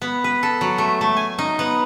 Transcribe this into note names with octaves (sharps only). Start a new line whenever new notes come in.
B3
B4
A4
F#3
A3
A3
G#5
D#4
B3